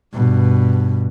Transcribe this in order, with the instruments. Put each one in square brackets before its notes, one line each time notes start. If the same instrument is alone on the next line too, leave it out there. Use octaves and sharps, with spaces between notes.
[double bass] G2 B2